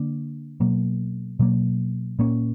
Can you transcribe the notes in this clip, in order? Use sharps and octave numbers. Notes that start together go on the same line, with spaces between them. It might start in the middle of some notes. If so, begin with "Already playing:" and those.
Already playing: D3 A#3 D4
B2 F#3 A#3
B2 F#3 A#3
A#2 A#3 C#4